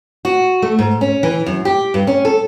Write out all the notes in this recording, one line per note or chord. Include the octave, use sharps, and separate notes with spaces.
F#4
A3
G#2
C#4
E3
F#2
G4
G2
C#4
A4